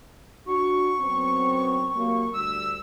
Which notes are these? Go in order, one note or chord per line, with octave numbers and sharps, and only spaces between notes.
D4 F#4 C#6
F#2 B3 C4
C3 F#3 A#3
D2 G3 E6